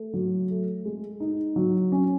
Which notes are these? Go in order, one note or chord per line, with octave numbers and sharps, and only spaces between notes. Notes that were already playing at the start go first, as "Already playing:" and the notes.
Already playing: A3
F#3
A3
G#3
D#4
F#3
C#4